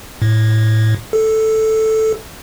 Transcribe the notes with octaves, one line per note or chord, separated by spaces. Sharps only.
A2
A4